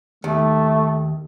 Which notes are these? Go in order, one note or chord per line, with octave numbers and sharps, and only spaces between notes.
D#2 A3